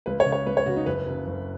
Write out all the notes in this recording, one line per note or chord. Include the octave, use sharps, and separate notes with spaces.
C#2 B4
C#5
C#3
C#5
C#2 B4
C#5
C#3 F#4
D#4
F#1 B4
F#2 C#3
F#1